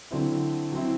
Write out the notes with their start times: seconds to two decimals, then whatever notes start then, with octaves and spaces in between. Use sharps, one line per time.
0.11 D3 F#3 C4 E4
0.72 F#3 C4 E4